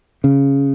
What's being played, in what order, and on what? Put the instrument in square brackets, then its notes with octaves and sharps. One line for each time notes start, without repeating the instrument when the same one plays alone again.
[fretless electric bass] C#3